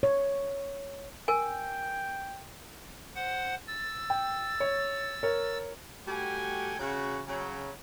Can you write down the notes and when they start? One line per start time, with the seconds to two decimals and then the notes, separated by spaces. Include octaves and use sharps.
0.03 C#5
1.28 A#4 G5 G#5
3.15 C5 F#5
3.67 E6 A6
4.10 G5
4.60 C#5
5.23 A#4 C#5
6.07 G3 A3 F#4 G5 G#5
6.80 C#3 F#4
7.27 C#3 F#3